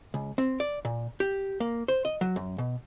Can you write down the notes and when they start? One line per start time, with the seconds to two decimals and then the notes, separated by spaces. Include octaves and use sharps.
0.14 C#2
0.38 C4
0.60 D5
0.85 A#2
1.20 G4
1.60 A#3
1.88 C5
2.05 D#5
2.21 F#3
2.36 F#2
2.58 B2